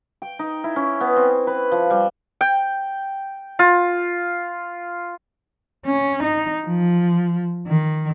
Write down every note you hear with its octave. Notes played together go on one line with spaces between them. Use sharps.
G5
D#4
E4
C#4
B3
C4
B4
F3
G3
G5
F4
C#4
D#4
F3
D#3